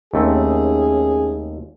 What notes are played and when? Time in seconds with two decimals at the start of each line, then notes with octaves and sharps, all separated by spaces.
0.14 D#2 A3 C4 C#4 G#4